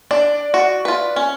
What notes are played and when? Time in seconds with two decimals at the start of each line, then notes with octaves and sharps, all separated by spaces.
0.11 D4 D5
0.54 F#4
0.85 F4 B4
1.16 C#4